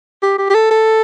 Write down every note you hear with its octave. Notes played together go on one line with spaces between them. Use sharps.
G4
G4
G4
A4
A4